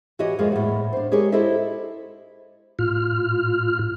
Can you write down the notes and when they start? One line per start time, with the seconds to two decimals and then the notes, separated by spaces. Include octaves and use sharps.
0.19 E3 F#4 G4 C#5 D#5
0.39 F2 F3 G#3 A#3
0.52 E2 A2
0.93 D4 C5
1.12 G#3 G4 G#4 A#4 C#5
1.32 E4 G4 A4 C5 D#5 E5
2.79 A2 F4 F6